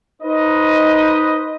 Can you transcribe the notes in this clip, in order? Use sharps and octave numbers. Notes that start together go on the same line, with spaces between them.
D#4 B4 C5 D#5